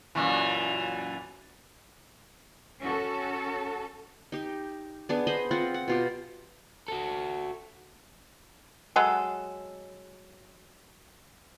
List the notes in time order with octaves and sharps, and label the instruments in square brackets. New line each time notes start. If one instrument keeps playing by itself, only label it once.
[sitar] F#2 A#2 E3
[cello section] C#4 F#4 A4
[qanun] D#4 G4
B3 D4 G#4
C5 D#5 B5
C4 F4 F#5
F#5
B2 F4 G4
[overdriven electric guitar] F#4 A4
[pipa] F#3 G#3 A4